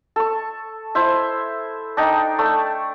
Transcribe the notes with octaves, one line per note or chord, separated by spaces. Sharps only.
A4 C#6
E4 C5 E5
D4 D#4 G5
A3 D5